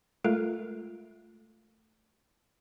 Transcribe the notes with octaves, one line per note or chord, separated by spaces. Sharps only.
G#3 A3 F4 A4 A#4